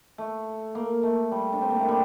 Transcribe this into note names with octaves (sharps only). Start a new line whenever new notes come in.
A3
A#3
A3
G3
D4
C4
A#3
A3
G3